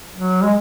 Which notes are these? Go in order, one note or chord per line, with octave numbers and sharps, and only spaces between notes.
F#3
G#3